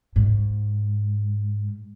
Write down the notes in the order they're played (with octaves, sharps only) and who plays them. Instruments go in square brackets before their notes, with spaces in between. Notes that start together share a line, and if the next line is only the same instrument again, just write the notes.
[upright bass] G#2